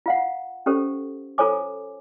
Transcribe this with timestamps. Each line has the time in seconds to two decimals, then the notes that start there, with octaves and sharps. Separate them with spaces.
0.06 F4 F5 F#5
0.66 C#4 G4 A4 C5
1.38 F4 A4 C5 C#5 G#5 D6